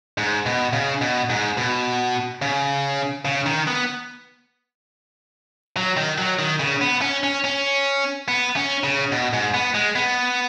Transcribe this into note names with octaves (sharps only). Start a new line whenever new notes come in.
G#2
B2
C#3
B2
G#2
B2
C#3
C#3
D#3
B3
F#3
D#3
F#3
D#3
C#3
B3
C#4
C#4
C#4
B3
C#4
C#3
B2
G#2
B3
G#3
B3